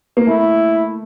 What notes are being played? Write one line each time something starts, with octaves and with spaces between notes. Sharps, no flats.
A#3
A3 E4